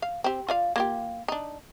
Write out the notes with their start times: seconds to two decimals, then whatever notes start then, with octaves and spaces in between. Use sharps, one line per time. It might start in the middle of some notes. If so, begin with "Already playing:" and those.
0.02 F5
0.24 C4 G4
0.49 F4 D5 F5
0.76 A#3 F4 G4
1.28 D4 D#4